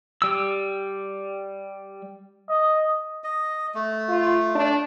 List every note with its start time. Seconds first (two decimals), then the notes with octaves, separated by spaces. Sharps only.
0.22 G3 E6
2.49 D#5
3.24 D#5
3.75 A3
4.08 F4
4.55 D4